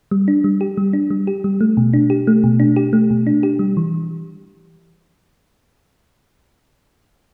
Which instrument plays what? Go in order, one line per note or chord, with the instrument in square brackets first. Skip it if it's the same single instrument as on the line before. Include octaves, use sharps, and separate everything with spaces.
[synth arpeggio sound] G3
D4
G3
G4
G3
D4
G3
G4
G3
A3
B2
D4
G4
A3
B2
D4
G4
A3
B2
D4
G4
G3
E3